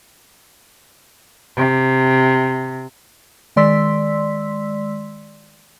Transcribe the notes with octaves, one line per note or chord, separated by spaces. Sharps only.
C3
D#3 G#3 D5 C6 E6 B6